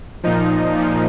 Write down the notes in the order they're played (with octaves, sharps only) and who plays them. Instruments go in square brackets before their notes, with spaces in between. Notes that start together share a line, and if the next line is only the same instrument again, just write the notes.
[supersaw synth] A#2 F3 D#4
A#2 F3